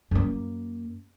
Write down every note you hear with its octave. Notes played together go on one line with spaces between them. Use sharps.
F#2 A#3